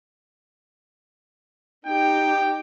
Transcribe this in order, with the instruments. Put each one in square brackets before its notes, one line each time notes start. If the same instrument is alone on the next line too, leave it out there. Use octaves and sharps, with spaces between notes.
[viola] D#4 G4 [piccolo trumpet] G5